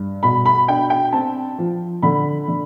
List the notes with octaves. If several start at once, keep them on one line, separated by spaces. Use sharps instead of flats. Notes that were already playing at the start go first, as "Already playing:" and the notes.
Already playing: G2
B2 B5
B5
D4 G5
G5
C4 A5
F3
D3 B5
D3